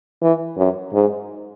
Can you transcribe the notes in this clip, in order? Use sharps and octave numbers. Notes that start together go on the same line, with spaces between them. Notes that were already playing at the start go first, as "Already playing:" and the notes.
E3
F#2
G#2